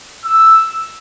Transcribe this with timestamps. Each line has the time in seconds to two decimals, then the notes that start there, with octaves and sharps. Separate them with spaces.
0.25 E6